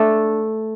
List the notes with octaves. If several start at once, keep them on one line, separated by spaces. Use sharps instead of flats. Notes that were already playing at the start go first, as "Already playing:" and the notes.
Already playing: A3 D4 A4